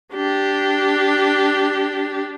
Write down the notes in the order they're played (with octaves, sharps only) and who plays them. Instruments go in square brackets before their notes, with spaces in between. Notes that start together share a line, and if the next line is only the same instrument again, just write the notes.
[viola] D4 G4